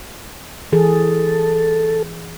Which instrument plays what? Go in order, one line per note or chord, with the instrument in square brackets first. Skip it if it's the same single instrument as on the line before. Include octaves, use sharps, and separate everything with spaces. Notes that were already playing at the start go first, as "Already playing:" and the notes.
[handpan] E3 G#4 [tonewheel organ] A4